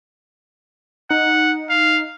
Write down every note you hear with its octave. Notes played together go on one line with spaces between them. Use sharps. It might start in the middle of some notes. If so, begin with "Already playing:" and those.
D#4 F#5
F5